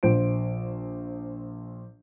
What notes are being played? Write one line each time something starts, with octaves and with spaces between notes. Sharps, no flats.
A#1 C5 D7